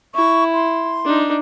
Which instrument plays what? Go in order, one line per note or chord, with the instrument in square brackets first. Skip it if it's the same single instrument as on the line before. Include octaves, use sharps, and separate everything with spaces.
[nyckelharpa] E4 [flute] C#6
[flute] C6
[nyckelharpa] D4 D#4